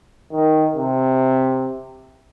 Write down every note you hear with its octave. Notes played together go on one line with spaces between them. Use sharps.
D#3
C3